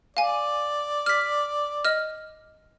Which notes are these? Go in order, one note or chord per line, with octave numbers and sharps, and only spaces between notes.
D5 F5 G#5
F6 B6
D#5 F6